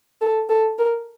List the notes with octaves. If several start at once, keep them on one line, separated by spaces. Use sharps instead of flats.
A4
A4
A#4